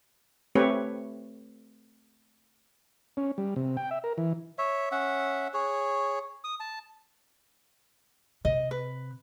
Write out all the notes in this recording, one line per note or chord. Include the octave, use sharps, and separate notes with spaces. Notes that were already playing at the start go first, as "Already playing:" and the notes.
A3 C4 G4 B4 C#5
C#4
G3
C3
G5
E5
A#4
E3
C#5 E5
C#4 E5 F#5
G#4 C#5
D#6
A5
C3 D#5
B4